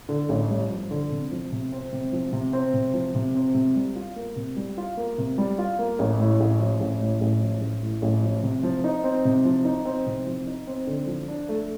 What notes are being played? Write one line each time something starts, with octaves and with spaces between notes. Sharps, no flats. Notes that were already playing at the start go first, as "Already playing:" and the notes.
D3
A1
G2
F3
D3
C3
F3
C3
C4
C3
F3
C3
C4
C3
F3
C3
C4
C3
G3
F4
A#3
C3
G3
F4
A#3
C3
G3
F4
A#3
A1
A2
A1
F3
A1
A2
A1
F3
A1
A2
A1
F3
C3
F3
D#4
C4
C3
F3
D#4
C4
C3
F3
D#4
C4
D3
F3
D4
A3